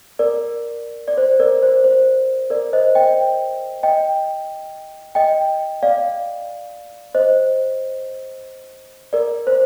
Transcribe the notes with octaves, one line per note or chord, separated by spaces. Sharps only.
A#4 D5
D5
C5
A#4 D5
C5
C5
A#4 D5
C5 D#5
D#5 G5
D#5 G5
D#5 G5
D5 F5
C5 D#5
A#4 D5
C5